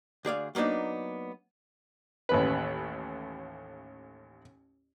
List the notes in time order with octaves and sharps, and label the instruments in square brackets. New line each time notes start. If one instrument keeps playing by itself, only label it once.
[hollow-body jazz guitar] D2 G#4 D5 F5
F#3 A#3 B3 D4 D#4
[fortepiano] A1 D#2 B4